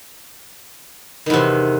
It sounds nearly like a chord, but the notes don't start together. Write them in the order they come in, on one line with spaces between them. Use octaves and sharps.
D#3 E2 C3